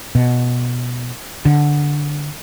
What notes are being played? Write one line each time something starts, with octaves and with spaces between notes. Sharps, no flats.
B2
D3